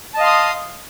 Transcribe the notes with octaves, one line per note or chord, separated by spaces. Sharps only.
D#5 F5 A5 C6 D#6